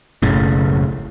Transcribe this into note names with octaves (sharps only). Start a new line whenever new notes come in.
F#1 B1 A2 C#3